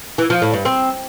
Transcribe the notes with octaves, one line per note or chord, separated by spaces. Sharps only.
E3
F3
A2
G2
C4